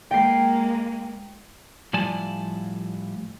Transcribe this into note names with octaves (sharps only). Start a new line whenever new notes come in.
G#3 A#3 G5 C7
A2 F3 G3 D5 G#5 A5